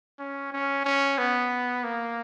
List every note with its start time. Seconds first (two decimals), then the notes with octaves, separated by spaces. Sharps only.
0.19 C#4
0.52 C#4
0.85 C#4
1.18 B3
1.84 A#3